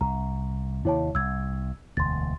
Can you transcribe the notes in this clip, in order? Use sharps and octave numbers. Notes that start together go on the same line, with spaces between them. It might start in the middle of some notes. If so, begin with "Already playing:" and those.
C2 A#5
D#2 C3 E4 C#5 A5
C2 E6 G#6
E1 D2 C6 A6